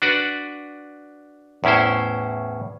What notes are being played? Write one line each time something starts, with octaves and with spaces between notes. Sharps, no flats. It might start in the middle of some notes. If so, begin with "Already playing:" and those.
D4 F#4 B4 D5
E2 A2 C#4 E4 C5